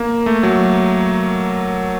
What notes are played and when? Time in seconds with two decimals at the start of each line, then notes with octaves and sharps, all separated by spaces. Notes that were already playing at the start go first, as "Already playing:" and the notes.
Already playing: A#3
0.26 A3
0.43 F#3